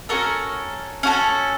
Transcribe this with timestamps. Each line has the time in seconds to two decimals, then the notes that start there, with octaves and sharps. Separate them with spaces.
0.09 C#4 F#4 A4 A#4
1.03 C#4 F#4 A4